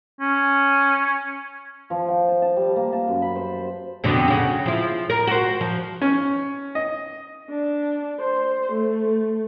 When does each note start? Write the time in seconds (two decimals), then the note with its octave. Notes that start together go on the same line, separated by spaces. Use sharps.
0.21 C#4
1.90 F3
2.08 G5
2.28 A5
2.42 A5
2.56 G3
2.76 A#3
2.93 A5
3.08 F#2
3.22 B5
3.35 C5
4.04 F2 B2 D3
4.28 C#3 F#4
4.66 F3 E4
5.10 A#4
5.27 F#4 C5
5.61 F3
6.02 C#4
6.75 D#5
7.50 D4
8.20 C5
8.72 A3